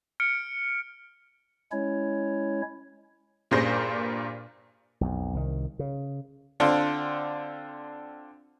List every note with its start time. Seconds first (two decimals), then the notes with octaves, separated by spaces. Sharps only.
0.20 F6 C#7 D7
1.72 G#3 C#4 E4 C#5
3.51 G2 A#2 A#3 G#4 C5 A#6
5.01 B1 F2
5.34 C2 D#3
5.79 C#3
6.60 D3 C4 D4 F4 C6